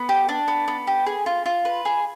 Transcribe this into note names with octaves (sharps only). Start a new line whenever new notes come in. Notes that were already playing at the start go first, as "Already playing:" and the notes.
Already playing: B3
G4
D4
B3
B3
G4
G#4
F4
F4
B4
G#4